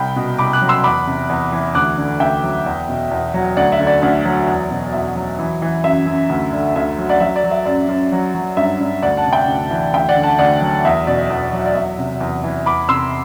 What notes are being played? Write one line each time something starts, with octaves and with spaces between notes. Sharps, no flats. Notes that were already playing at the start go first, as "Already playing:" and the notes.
Already playing: C2 G5 B5
B2
C2 B5 D6
D6 F#6
F#3
C6 E6
E2 B5 D6
C3
E2
E3
D2 D6 F#6
D3
D2 E5 G5
F#3
E2
B2
E2
F#3
D2 D5 F#5
E5
D3
D5
D2 D5
F#3
E2
B2
E2 E5
F#3
E3
E3
F#2 E5
F#2
D2
D3
D2 E5
F#3
D5 F#5
F#3 E5
D5
F#3
E5
F#2 D5
F#2
F#3
F#3
G2 E5
G2
D2 D5 F#5
F#5 A5
C3
E5 G5
D2
E3
D2 E5 G5
D5 F#5
D3
F#5 A5
D2 D5 F#5
F#3
E2 E5
B2 D5
E2
F#3
D5
E2 E5
C3
E2
E3
E2 B5 D6
C3 C6 E6